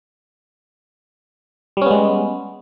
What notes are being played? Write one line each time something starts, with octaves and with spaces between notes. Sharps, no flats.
G3 G#3 B3 C#4